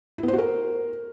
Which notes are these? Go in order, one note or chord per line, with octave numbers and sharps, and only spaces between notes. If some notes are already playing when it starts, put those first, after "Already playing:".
E4
B3
C5
F#4
A#4